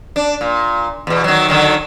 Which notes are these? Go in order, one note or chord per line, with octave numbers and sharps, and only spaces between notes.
D4
A#2
E2 B2
D#3 F#3
D3 D#3 F#3